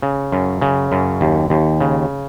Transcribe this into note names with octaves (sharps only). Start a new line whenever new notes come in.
C#3
F#2
C#3
F#2
D#2
D#2
C#3